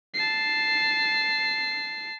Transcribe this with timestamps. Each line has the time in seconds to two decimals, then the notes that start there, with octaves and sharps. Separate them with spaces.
0.14 A5 C7